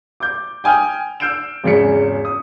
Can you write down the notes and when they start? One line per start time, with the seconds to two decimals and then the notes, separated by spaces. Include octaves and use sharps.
0.20 D6 G6
0.64 G5 G#5 D#6 F6 G6
1.20 E6 F6 G6 C7 D7 E7
1.64 G#1 E2 C#3 C#4 B6 C#7
2.25 D#6